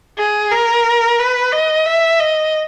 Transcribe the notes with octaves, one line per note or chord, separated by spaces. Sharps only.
G#4
A#4
B4
D#5
E5
D#5